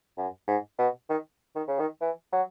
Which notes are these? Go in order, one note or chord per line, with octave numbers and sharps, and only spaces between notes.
F#2
G#2
B2
D#3
D#3
C#3
D#3
E3
F#3